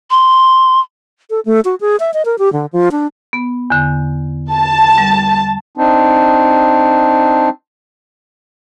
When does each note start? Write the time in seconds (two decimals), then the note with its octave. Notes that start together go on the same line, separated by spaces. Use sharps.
0.11 C6
1.30 A4
1.45 A3
1.65 F#4
1.81 G#4
2.00 E5
2.14 D#5
2.25 A#4
2.39 G4
2.53 D3
2.73 F3
2.92 D4
3.33 B3
3.70 E2 D3
4.53 A5
4.98 G3
5.78 C4 D4 D#4